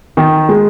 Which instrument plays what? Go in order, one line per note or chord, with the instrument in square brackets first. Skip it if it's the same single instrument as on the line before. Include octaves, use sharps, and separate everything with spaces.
[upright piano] D#3
G#3